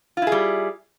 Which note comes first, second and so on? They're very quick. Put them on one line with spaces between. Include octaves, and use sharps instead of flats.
F4 E4 G#4 G3